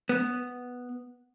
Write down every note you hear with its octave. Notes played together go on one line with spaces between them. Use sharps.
B3